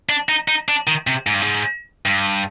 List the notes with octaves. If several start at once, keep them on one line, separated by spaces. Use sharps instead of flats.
D4
D#4
D#4
D4
D#3
C3
G#2
G2
G#2
G2